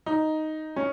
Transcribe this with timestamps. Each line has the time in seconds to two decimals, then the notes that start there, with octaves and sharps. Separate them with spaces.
0.06 D#4
0.76 C#4